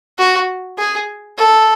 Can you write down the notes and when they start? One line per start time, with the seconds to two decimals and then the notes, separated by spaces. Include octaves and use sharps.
0.18 F#4
0.79 G#4
1.38 A4